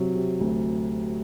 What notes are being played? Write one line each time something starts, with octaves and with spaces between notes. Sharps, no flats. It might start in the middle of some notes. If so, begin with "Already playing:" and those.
Already playing: C3 F#3
C3
D2